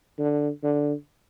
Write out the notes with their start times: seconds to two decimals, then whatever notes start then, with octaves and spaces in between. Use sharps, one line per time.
0.19 D3
0.63 D3